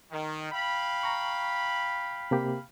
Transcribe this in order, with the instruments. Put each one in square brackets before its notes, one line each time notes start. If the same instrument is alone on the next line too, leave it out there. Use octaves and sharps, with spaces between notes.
[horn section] D#3
F5 G5 B5
[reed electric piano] A#5 C#6
C3 A#3 G4